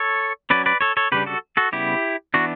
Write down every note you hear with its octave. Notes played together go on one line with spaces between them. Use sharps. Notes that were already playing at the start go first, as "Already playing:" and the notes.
Already playing: A4 C#5
F#3 C#4 B4 D5
B4 D5
A4 C#5
A4 C#5
C#3 G3 D4 G4 B4
F#4 A4
F#4 A4
C#3 G3 B3 E4 G4
E3 B3 D4 F#4